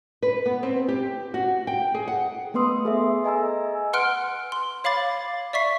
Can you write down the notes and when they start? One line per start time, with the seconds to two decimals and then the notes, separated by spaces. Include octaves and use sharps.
0.23 B4
0.46 B3
0.63 C4
0.88 G4
1.34 F#4
1.67 G5
1.95 G#4
2.08 F#5
2.54 A3 B3 B4 C6 D#6 E6
2.85 G#4 A4 E5
3.24 D#5 G#5 A#5 E6
3.93 B4 F#5 C6 F6 F#6 D7
4.52 C6
4.84 C#5 F5 B5 D6 A6
5.53 D5 E5 C#6 B6 C7